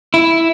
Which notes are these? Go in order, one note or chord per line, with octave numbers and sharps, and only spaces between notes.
E4